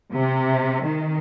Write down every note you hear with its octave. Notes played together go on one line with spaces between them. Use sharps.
C3
D#3